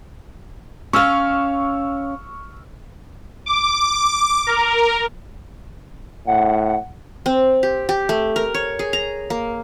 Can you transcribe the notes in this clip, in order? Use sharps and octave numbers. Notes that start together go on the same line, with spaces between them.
C#4 F5 C#6 E6 F6
D6
A#4
A2 F#5
C4
G4
G4
A3
A#4
C#5
G#4
A#5
A#3